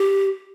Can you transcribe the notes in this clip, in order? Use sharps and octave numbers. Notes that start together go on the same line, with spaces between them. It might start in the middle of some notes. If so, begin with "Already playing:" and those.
Already playing: G4